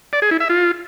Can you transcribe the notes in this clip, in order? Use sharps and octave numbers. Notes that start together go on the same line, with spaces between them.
D5
G#4
E4
E5
F4